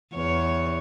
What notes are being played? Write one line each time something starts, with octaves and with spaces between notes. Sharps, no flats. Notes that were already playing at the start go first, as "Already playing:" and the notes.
E2 C#5